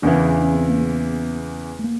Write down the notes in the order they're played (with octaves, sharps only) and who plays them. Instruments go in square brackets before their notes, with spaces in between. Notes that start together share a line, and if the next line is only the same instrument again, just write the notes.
[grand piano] E2 C#3 E3 [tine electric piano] D4
[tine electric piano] C#4
C#4
D4
C#4
C4
A#3
B3
A3
A#3